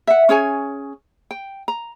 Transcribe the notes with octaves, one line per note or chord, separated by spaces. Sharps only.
E5 F#5
C#4 G#4 C#5 G#5
G5
A#5